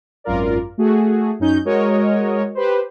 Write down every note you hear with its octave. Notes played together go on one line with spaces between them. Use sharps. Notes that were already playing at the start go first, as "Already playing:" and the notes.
G#1 F#2 F4 A#4 D5
A3 F#4 G#4
F#2 C#4 D#4 G6
G#3 F#4 A#4 C#5 D#5
G4 B4 C5